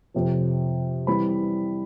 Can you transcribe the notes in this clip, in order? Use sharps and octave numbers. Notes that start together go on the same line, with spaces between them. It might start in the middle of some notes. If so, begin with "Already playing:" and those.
F2 C3 F3
E3 G3 C4 B5